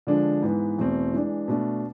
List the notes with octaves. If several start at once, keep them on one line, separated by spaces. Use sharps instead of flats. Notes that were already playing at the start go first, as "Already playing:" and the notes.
D3 F3 G#3 D4
G#2 E3 B3
E2 B2 A3 C4
E3 G#3 D4
B2 A3 D4